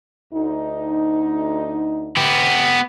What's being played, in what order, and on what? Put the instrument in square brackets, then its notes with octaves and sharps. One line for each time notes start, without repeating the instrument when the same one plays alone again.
[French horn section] D2 D#4
[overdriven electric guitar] B3 G4